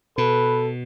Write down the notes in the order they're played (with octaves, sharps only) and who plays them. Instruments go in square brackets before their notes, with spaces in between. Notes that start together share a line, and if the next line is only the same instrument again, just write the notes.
[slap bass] B2 [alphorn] A4 [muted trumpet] B4